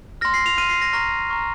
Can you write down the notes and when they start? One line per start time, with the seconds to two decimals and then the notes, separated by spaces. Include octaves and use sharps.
0.21 F6 A#6
0.25 C6
0.34 C7
0.46 F7
0.58 C6 F6 D#7
0.70 C7
0.82 A#6
0.93 A#5 C#6 F6 A#6
1.29 A#5 C#6 F6